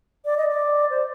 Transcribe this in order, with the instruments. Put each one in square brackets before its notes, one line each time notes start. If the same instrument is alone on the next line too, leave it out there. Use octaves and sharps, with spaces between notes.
[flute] D5
D#5
D5
C5